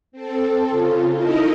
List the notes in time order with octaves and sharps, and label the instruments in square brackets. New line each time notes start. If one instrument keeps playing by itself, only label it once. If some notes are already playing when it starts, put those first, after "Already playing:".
[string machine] C4 A4
C#3 F4
D#4 E4 A4 A#4 D#5